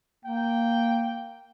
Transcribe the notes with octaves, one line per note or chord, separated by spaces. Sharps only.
A#3 G5